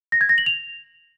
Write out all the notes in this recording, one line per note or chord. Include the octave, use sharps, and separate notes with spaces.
A#6
G#6
A#6
F#7
F7